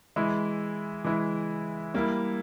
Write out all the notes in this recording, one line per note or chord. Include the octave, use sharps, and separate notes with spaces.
E3 G#3 E4
E3 G#3 E4
G3 A#3 E4